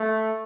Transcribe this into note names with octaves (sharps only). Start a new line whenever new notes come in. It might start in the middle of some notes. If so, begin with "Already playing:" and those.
Already playing: A3